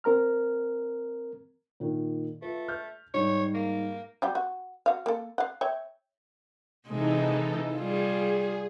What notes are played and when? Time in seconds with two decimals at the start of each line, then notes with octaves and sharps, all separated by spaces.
0.04 C4 A#4 A#5 F6
1.80 A#2 D#3
2.42 A3 F4 B4
2.68 F6 G6
3.14 G#2 G3 C#5
3.54 A#3
4.22 F#3 G3 G4
4.35 F#4
4.86 F#4 F5
5.06 A#3 A4
5.38 F5 F#5
5.61 C#5 E5 G5
6.88 C3 E3 G#3 D#4 A4
7.76 G3 F4 G#4